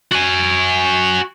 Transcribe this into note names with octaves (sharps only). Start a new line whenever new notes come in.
F#4 G#5